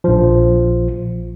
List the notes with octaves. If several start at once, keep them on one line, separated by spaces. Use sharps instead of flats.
A#1 F3